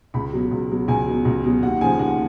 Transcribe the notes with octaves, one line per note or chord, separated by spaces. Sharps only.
C#2 B5
B2 F#3
C#2
B2 F#3
C#2 G#5
B2 F#3
C#2
B2 F#3
D#2 F#5
C#3 F3 G#5
D#2 F#5